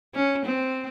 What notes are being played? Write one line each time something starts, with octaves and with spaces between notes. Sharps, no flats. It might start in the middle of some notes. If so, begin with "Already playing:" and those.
C#4
C4